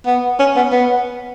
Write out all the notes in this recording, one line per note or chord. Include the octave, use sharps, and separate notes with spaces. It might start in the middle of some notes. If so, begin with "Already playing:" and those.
B3
C#4
B3
B3